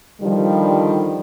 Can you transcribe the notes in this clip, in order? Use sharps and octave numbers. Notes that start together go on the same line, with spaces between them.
D3 D#3 F3 G3